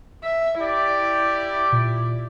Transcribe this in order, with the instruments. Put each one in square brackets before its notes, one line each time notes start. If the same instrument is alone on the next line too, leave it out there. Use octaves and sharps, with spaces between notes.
[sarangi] E5
[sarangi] E4 [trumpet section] G4 D5
[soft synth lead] A#2